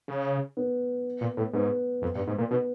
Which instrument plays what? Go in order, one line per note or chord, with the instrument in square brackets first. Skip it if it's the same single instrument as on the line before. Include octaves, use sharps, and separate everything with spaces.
[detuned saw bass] C#3
[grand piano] B3
[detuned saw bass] A#2
A2
[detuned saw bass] G#2 [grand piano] B3
[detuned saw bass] F2
G2
G#2
A#2
[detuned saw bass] B2 [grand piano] B3